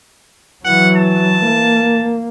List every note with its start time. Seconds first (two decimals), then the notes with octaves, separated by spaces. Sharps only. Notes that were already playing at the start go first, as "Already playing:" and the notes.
0.65 E3 F#3 F#5
0.96 A5
1.45 A#3